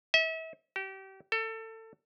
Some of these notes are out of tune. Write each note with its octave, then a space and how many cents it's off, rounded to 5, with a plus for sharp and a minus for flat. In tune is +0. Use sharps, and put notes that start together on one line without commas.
E5 -35
G4 -30
A4 +25